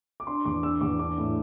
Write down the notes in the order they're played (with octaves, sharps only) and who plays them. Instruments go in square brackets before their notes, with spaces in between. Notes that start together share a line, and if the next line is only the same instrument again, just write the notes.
[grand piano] D6
D4 C6
E2 D6
D4 E6
E2 D6
D4 D6
A2